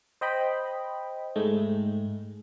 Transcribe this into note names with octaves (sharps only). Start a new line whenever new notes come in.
C5 D#5 G5 B5
G#2 G#3 A3